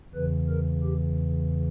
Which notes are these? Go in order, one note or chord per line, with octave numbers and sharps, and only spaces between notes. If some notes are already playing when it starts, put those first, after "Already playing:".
E2 C#3 E3 B4
A#4
G4